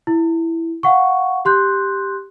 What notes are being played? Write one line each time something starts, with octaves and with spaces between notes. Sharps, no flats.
E4
F5 F#5 C#6
G4 C6 F#6 G6